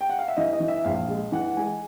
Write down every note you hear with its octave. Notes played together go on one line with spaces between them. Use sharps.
G5
F#5
F5
E5
E3 D#5
D#5
E3
E5
A#1 F5
G#3
E3 F#5
G#3 G#5